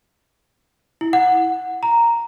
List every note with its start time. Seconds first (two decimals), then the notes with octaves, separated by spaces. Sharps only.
1.01 E4
1.13 F#5
1.83 A#5